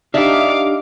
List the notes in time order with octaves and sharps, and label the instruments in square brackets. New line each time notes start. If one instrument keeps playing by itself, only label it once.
[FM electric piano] D4 G4 [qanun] D#4 D5 E5 [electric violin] F5 D6